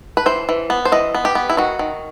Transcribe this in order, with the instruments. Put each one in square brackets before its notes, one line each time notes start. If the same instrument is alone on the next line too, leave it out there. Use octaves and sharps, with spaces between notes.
[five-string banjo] B4
E3 C5
E3
B3
C5
E3 D#5
B3
G4
B3
E4
D#3 F#4
D#3